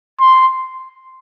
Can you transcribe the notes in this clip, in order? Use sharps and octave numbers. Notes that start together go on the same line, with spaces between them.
C6